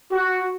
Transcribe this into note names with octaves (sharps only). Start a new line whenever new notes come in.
F#4